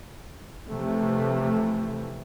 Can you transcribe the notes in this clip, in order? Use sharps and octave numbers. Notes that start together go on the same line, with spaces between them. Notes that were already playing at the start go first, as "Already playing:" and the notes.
C3 E3 F3 A3